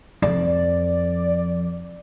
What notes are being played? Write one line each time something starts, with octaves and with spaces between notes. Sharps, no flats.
F2 D5